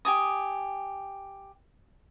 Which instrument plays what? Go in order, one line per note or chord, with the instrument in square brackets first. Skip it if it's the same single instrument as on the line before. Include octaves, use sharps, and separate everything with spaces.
[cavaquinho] G4 G#5 D#6